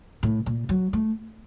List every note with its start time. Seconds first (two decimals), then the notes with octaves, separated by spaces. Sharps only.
0.23 A2
0.46 A#2
0.69 F#3
0.93 A3